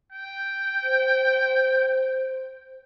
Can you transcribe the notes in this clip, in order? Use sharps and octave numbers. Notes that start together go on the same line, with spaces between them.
G5
C5